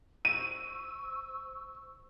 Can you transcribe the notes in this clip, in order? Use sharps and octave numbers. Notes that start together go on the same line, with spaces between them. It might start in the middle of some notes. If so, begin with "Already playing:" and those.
C5 C#6 E6 D#7